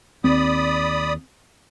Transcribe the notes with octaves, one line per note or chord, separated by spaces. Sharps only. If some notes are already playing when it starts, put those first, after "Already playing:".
D#2 C4 D5 B5 D#6